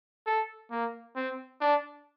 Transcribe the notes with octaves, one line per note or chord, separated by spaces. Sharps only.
A4
A#3
C4
D4